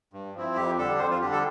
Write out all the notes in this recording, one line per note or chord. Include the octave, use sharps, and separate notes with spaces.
G2
F3 C4 E4
F2 G4
D3 G3 D4 A4
F2 C5
F4
D3 G3 D4 G4
A4